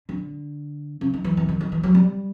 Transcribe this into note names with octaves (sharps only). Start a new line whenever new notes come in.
D3
C#3
D#3
E3
E3
D#3
D#3
E3
F#3
G3